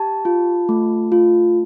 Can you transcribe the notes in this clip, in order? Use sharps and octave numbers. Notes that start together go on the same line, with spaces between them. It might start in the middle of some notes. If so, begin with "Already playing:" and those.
Already playing: G4 A5
F4
A3
F4